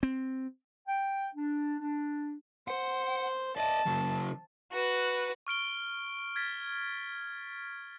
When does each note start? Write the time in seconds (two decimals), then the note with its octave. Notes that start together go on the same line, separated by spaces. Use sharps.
0.03 C4
0.88 G5
1.35 D4
1.80 D4
2.68 C5 F#5
3.57 D5 D#5 A5
3.86 C#3 F#3
4.72 F#4 B4
5.47 C#6 F6 D7 G7
6.35 F6 G#6 A6 B6